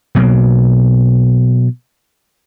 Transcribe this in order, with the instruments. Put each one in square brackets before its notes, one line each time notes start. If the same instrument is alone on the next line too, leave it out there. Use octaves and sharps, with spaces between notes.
[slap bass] B2 F#3 A#3